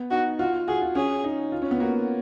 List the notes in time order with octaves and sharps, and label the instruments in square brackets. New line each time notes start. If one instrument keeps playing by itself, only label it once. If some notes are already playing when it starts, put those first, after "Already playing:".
Already playing: [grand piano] B3
[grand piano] D#4 [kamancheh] F#4
[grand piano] F4 [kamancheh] F#4
[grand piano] F#4 [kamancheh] G#4
[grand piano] F4
[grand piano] C#4 [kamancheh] G#4
[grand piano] D#4
F4
C#4
B3
[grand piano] A#3 [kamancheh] F#4